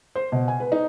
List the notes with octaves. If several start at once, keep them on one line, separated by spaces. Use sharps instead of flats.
C5
B2
G#5
B4
D#4